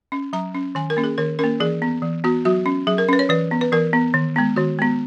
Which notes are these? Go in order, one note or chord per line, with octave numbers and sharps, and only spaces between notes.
C#4
F#3 A#5
C#4
D#3 G#5
A#4
A#3 C#4
G#4
D#3 A#4
A#3 C#4 A#4
E3 G#4
B3
E3
B3 F#4
F#3 F#4
C#4
F#3 G#4
A#4
C#4 B4
C#5
E3 B4
B3
B4
E3 A#4
B3
D#3
G#3 B3
D#3 F#4
G#3 B3